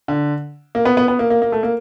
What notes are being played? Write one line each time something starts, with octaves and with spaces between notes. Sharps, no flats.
D3
A#3
B3
B3
B3
A#3
A#3
A#3
A3
A#3